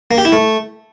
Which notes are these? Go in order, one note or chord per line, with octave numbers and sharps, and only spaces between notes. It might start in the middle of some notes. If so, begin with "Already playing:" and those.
A#3
G4
E4
A3